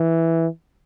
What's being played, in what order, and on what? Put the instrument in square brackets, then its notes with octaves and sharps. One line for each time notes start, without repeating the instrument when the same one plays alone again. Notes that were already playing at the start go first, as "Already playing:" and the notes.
Already playing: [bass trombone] E3